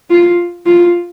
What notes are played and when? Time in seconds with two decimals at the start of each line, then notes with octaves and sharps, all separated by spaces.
0.10 F4
0.66 F4